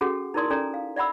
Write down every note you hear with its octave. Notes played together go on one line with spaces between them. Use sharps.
C#4 F#4 G#4 A4 F#5
D#4 E4 A#4 D5 C6 D#6
C#4 A4 D5 G#5 A#5
F5
D5 E5 F#5 B5 E6